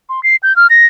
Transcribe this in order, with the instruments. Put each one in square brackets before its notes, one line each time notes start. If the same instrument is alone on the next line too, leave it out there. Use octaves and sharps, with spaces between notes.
[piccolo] C6
C7
G6
F6
A#6